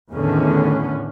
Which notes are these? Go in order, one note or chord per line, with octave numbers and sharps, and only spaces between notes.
E2 A2 D3 D#3 C#4